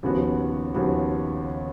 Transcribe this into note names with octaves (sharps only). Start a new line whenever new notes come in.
D#2 C#3 F3 B3 F#4
D#2 C#3 F3 B3 F#4